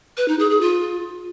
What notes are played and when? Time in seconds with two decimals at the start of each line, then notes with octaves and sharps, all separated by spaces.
0.17 B4
0.28 D#4
0.39 G#4
0.50 G#4
0.61 F4